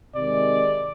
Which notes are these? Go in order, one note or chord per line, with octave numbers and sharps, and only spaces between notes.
C3 D#3 G#3 D5